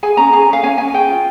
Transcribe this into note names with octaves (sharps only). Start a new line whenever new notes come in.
G#4 G#5
C#4 A#5
G#4 G#5
C#4 F5
C#4 G#5
C#4 G#5
G#4 G5
F4